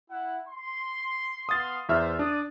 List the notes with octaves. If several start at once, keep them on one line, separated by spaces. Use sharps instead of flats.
E4 F#5
C6
B3 F5 C6 D#6 A6
E2 C5 E5 F6
D4 D5 D#6